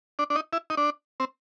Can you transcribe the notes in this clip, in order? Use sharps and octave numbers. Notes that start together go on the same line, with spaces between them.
D4
D4
D#4
E4
D#4
D4
C4